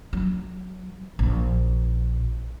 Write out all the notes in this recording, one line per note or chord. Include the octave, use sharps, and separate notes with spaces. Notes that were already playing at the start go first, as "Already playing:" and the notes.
F#3
A#1